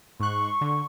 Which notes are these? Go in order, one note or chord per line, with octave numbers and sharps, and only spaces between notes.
G#2 C6 C#6 F#6
D3